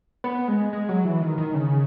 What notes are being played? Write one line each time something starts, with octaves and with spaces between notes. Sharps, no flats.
B3
G#3
G#3
F#3
E3
D#3
D#3
C#3